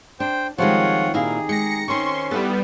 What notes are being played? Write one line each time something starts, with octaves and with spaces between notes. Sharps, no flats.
D4 C5 G5
D#3 F3 G3 G#3 C4 F4 C#5 F#5
A#2 D#4 E4 G4 G#4 F5 A#5
G#3 G5 A#6 C#7
D#3 C4 C#4 C6 C#6
G3 B3 E4 A4